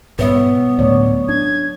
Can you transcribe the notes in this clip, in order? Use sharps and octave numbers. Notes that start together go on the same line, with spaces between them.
G#2 B2 G3 B3 B4 C#5 E5
D2 A2 F#3 A3 C#5 D5
D4 G#6